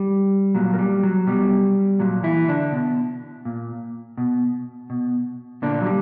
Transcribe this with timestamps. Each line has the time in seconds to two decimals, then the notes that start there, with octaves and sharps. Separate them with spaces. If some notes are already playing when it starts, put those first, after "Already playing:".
Already playing: G3
0.55 A#2 F#3
0.74 A#3
0.79 G3
1.03 F#3
1.27 B2 G3
1.99 A#2 F#3
2.23 E3 E4
2.48 D3 D4
2.72 B2
3.45 A#2
4.18 B2
4.90 B2
5.62 A#2 D3 D4
5.81 F#3
5.86 G3